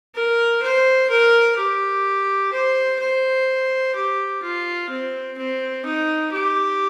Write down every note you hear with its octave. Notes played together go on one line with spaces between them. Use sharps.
A#4
C5
A#4
G4
C5
C5
G4
F4
C4
C4
D#4
G4